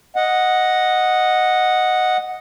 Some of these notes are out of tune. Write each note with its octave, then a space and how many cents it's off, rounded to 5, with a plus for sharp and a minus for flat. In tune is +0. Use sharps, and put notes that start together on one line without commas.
D#5 +0 F#5 -5